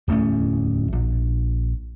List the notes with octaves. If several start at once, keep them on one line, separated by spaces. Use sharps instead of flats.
D1 E2 A3 C#4
A#1